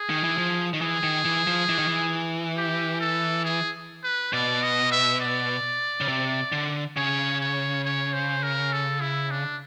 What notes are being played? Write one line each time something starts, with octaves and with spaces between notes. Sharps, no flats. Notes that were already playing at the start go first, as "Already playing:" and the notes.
Already playing: G#4
D#3
E3
F3
D#3
E3 G#4
D#3
E3
F3
E3
D#3
E3
G4
A4
G#4
B4
B2 D5
D#5
E5
D5
C#3
C3
D3
C#3 C#5
C#5
C#5
C5
A#4
A4
E4
D4